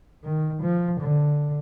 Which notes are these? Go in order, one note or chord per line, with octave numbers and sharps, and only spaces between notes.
D#3
F3
D3